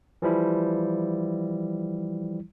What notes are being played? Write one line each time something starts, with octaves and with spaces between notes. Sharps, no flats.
E3 F3 G3 E4